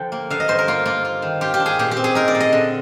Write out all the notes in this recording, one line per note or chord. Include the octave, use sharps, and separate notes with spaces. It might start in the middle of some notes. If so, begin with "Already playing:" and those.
Already playing: D3 F3 G5
A#3
D3 F5
D#5
G2 C5
A#4
A#3 F4
A#3 F4
F4
D#3
F4 G4
G4
D4
G#4
A#2 G4
G4
C4
G#4
D#4 A#4
D5
A#2
D#5
D3